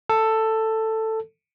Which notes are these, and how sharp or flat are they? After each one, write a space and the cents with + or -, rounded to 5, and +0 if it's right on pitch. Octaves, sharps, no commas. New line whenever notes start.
A4 +10